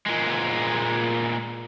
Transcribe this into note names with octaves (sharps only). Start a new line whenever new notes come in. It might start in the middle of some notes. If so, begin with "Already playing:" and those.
A#2 G#3